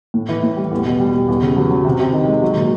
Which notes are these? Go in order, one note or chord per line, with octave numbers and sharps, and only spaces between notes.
A2
E3
A2
G3
E2
B2
G3
G3
E2
C#3
F#3
F#3
C3
C3
D#3
G#3
F#3
A#2